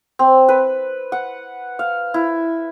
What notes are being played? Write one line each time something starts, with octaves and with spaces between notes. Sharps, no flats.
C4
B4
F#5
F5
E4